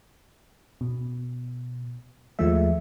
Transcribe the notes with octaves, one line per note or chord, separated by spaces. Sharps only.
B2
D#2 F3 G#3 A3 E5